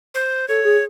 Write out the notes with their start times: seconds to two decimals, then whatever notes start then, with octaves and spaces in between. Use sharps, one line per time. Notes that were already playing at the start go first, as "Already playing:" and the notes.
0.14 C5
0.48 A4 C#5
0.65 G#4